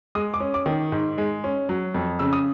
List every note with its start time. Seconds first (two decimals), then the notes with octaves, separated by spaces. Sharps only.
0.15 G#3 D#6
0.34 D6
0.40 C#4
0.54 D6
0.66 D#3
0.92 G#2
1.18 G#3
1.44 C#4
1.69 F#3
1.94 F2
2.19 C#3 E6
2.33 D#6